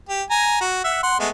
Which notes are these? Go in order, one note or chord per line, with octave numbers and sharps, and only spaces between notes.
G4
G#5 A#5
F#4
E5 F#5
F#5 C6
G#3 A3 B3